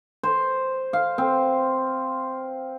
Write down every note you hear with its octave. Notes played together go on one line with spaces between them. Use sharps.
C5
F5
C4